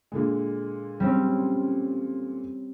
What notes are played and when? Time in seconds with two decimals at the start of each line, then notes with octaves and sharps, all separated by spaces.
0.12 A#2 D3 G#3
1.00 G3 C4 C#4